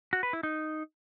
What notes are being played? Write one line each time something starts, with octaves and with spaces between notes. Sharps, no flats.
F#4
B4
E4
D#4